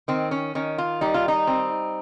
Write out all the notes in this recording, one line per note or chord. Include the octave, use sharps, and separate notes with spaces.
D#3 C4
C#4
D#3 C#4
F4
G3 D#4
F4
D#4
C4